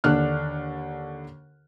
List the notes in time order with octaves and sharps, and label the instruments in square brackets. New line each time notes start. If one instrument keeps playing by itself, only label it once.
[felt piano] D#2 D3 D4 A4 F6 F#6